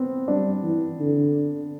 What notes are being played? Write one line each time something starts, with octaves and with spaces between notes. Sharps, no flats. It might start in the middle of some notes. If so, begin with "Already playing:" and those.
Already playing: B3 C4
G3 D4
E3
D3